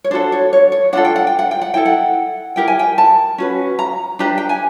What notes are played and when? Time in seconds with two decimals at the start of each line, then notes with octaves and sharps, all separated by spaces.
0.04 C#5
0.11 D4 F#4 A4 C5
0.32 C#5
0.53 C#5
0.72 C#5
0.93 D4 F4 A4 F#5
1.05 G5
1.16 F#5
1.27 G5
1.39 F#5
1.51 G5
1.61 F#5
1.74 E4 A4 G5
1.85 F#5
2.56 E4 G4 A#4 G5
2.68 G#5
2.79 G5
2.98 A5
3.38 C#4 F#4 B4
3.79 A#5
4.19 D4 G4 B4 A#5
4.38 G5
4.49 G#5